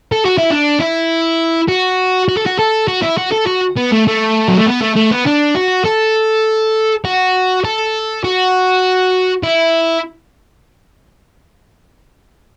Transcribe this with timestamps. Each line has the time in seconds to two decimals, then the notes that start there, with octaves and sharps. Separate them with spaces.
0.12 A4
0.25 F#4
0.38 E4
0.51 D4
0.80 E4
1.69 F#4
2.29 F#4
2.37 A4
2.46 F#4
2.59 A4
2.88 F#4
3.02 E4
3.18 F#4
3.32 A4
3.47 F#4
3.77 B3
3.92 A3
4.07 A3
4.48 F#3
4.57 A3
4.67 B3
4.81 A3
4.96 A3
5.11 B3
5.27 D4
5.56 F#4
5.85 A4
7.05 F#4
7.65 A4
8.24 F#4
9.43 E4